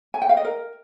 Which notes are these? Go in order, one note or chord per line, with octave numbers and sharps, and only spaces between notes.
G#5
G5
F5
D#5
A#4